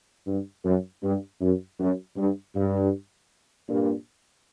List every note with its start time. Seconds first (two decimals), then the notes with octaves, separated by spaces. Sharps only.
0.27 G2
0.64 F#2
1.03 G2
1.41 F#2
1.79 F#2
2.17 G2
2.55 G2
3.69 G2 A#2